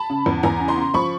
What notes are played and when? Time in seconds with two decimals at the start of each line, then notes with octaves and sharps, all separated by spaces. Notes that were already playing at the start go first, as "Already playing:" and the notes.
Already playing: A5 B5
0.10 C#3
0.26 E2
0.43 E2 G#5 A#5
0.60 C#3
0.68 A#5 C6
0.77 C#3
0.94 F3 B5 C#6